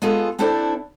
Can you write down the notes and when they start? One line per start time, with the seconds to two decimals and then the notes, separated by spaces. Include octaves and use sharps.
0.02 G#3 B3 F4 G#4 A4
0.39 C4 D4 E4 A4 C5 D5